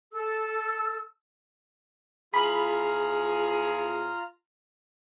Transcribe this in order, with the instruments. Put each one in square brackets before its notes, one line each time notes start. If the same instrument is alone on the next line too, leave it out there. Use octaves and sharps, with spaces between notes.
[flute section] A4 E6
[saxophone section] E2 F3 G#4 [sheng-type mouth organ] F4 A#5 [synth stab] B5